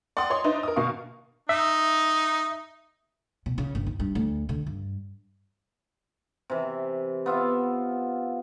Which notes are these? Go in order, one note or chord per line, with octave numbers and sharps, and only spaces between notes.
D5 F#5 G5 C6 D#6
C#5 D#5 C6
D4 D#4 B4 C5 D#5 E5
A#4 D#6
B2 A#4 F5 C#6
D#4 E5
B2
C#3
G1
D#4
G2
D2
D3
G2
C3 E3
B3 F4 E5